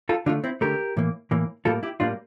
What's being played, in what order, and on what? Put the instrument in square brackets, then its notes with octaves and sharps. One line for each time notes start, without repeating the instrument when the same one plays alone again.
[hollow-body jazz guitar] F4 A4
D3 A3 D4 F4
C4 E4
D3 A3 G4 A#4
A2 E3 A#3
A2 E3 A#3
A2 G3 A#3 F4 A4
E4 G4
A2 G3 A#3 D4 F4